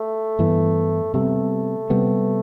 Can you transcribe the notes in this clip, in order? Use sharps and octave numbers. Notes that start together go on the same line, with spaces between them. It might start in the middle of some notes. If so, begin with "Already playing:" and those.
Already playing: A3
G2 E3 B3
C3 G3 A3 B3
C3 G3 B3